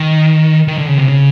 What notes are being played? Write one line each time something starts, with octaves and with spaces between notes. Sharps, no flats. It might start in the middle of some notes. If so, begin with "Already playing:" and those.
Already playing: D#3
D#3
D3
C#3
C3
C#3